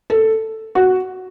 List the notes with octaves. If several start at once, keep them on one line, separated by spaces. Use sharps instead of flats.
A4
F#4